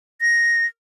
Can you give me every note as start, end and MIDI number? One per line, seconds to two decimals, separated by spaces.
0.22 0.65 94